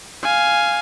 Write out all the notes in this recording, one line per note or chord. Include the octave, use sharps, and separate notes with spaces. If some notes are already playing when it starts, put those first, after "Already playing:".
F5 G#5